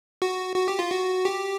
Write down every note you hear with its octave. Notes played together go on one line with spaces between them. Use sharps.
F#4
F#4
G4
F4
F#4
G4